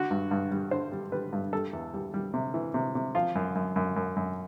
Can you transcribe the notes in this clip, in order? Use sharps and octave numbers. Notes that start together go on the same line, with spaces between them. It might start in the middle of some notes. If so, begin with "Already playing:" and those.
Already playing: D3 F#4
G2
G2
G3
D3 C5
G3
G3 B4
G2
G3 A4
E2
G3
G3
C3
E3
C3
C3
F3 F4
F#2
F#2
F#2
F#2
F#2